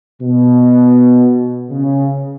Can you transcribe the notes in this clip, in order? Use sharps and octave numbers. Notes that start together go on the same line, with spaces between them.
B2
C#3